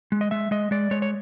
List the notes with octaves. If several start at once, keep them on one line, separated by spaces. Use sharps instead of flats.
G#3
D#5
G#3 E5
G#3 D#5
G#3 D5
G#3 C#5
C#5